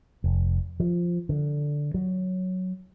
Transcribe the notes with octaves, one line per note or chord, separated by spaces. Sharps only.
F1
F3
D3
F#3